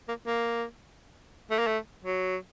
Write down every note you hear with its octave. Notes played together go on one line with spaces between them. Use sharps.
A#3
A#3
A3
A#3
A3
F#3